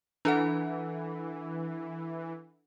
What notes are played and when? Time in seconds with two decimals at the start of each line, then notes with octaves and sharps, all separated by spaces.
0.25 E3 D4 A4 F#5